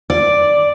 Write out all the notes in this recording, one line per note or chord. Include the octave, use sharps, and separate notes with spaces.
D5